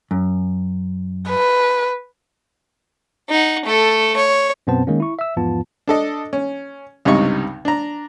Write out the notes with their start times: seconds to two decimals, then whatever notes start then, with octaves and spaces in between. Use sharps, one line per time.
0.11 F#2
1.29 B4
3.29 D#4 F#5
3.65 A3 A4
4.16 C#5
4.67 F#2 B2 B3 C4 C5 A5
4.87 D#3 G#3 A#3 C#4
5.00 E4 C#6
5.19 E5 E6
5.37 E2 G#2 F3 B3 F4 A5
5.87 D4 A4 D#5
6.33 C#4
7.05 C#2 G2 C3 D#4 C#6
7.65 D4 A#5